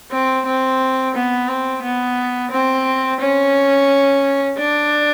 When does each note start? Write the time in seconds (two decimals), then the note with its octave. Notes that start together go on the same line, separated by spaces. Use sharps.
0.12 C4
0.46 C4
1.14 B3
1.48 C4
1.83 B3
2.51 C4
3.20 C#4
4.58 D4